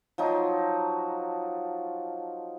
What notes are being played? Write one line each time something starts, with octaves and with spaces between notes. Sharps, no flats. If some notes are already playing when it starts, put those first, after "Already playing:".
F3 F#3 D#4